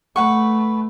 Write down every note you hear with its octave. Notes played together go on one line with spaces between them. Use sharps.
A3 B4 F#5 C#6